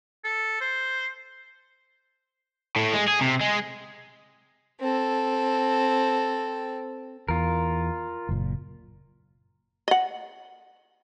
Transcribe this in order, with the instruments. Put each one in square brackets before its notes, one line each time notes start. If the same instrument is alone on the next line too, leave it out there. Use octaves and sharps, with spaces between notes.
[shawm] A4
C5
[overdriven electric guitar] A2
G#3
G#4
C3
G#3
[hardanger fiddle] C4 A4
[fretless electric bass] E2 [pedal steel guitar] F4 A#4
[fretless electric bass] F#1 A#2
[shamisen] D#5 F#5